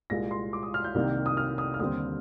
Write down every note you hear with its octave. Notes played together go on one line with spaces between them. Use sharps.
C2 A#2 G#3 A#6
C6
D6
D#6
F6
G6
C2 C3 D#3 A#3
D#6
F6
D#6
F6
D#2 D3 G3 C4 D#6